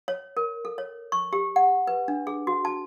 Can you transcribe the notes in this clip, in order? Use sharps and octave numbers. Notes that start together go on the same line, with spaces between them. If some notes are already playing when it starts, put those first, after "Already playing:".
C#5
A#4
A4
C#5
C#6
G4
F#5
B4
D4
G#4
F#4
A5